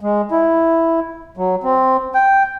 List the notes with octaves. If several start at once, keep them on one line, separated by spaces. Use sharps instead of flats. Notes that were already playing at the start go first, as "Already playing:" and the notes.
G#3
E4
F#3
C4
G5